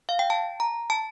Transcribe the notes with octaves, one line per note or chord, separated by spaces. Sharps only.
F5
G5
A5
A#5
A5